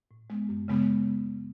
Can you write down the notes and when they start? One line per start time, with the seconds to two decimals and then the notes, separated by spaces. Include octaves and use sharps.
0.11 A2
0.30 G#3 B3
0.49 F#2
0.68 C#3 G#3 B3